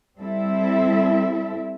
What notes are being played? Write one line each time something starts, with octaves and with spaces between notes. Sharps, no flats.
G3 C4 E4 A4 E5